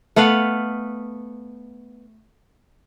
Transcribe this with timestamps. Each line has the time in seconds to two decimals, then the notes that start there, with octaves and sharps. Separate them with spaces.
0.16 A3 B3 F5 F#5